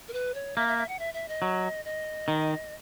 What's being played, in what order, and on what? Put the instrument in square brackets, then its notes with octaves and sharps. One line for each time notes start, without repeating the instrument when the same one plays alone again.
[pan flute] A#4
B4
C#5
[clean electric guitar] A#3 [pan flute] E5
[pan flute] E5
E5
F#5
E5
E5
D#5
[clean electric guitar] F#3
[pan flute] D#5
[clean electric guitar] D#3